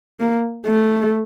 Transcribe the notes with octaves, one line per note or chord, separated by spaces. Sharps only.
A#3
A3